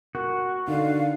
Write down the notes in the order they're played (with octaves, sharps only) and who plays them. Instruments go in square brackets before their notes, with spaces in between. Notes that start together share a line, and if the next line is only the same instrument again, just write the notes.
[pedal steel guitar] F#4 [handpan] A#4
[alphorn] D3 [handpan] D#4 [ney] F5